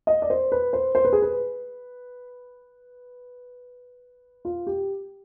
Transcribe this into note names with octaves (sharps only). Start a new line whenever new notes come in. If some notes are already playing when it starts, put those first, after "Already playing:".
D#5
D5
C5
B4
C5
C5
B4
G#4
B4
F4
G4